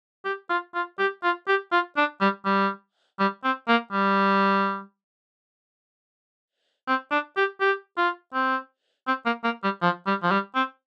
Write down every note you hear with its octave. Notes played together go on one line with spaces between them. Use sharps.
G4
F4
F4
G4
F4
G4
F4
D4
G3
G3
G3
C4
A#3
G3
C4
D4
G4
G4
F4
C4
C4
A#3
A#3
G3
F3
G3
F3
G3
C4